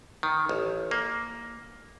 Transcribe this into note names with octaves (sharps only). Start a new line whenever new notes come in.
D#3
A1
A#3